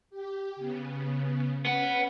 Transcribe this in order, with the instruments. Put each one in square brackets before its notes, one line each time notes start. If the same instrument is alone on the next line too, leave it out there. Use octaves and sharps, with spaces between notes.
[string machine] G4
C#3 B3
[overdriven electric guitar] B3 F#5 [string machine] C#4 B4